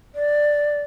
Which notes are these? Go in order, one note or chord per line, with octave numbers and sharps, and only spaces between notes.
D5